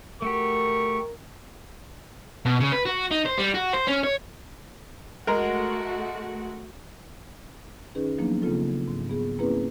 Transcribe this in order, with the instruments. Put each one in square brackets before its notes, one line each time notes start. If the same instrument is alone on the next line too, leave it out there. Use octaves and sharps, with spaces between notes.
[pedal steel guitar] A3 F#4 G4 [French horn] A#4 [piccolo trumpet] C#6
[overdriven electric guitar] B2
C#3
B4
F#4
D#4
C5
G3
F#4
C5
C#4
C#5
[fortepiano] G#3 A#4 [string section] A3 F#4
[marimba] D#3 C#4 D#4 G#4 B4
F3 F#3 A#3 B3 D4 D#4
C#3 A#3 C4 F4 A4
G#2
B3 G#4
A#3 C4 C#4 E4 G#4 B4